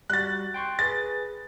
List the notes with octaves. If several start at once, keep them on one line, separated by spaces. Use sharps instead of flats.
G3 F#4 F#6 A6
G5 C6 C#6
G#4 B4 A6